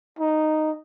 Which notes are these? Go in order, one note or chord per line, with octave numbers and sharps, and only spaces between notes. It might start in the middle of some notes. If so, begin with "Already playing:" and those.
D#4